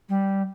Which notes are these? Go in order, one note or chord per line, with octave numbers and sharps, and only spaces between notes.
G3